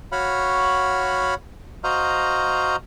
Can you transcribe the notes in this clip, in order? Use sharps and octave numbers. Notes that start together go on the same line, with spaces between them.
F#4 C#5 F5 F#5 B5
F#4 C5 D#5 F5 A#5